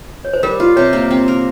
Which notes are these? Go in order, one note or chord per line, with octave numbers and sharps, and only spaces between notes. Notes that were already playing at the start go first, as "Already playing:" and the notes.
C#5
C5
G3 A#4
F4
C3 C#5
A#3
C4
A#4